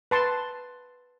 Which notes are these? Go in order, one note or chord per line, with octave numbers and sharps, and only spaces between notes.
B4 A5 C6